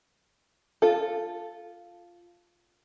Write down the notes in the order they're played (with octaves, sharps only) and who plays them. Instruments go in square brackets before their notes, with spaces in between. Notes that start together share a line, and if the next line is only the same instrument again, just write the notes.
[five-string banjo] F4 A4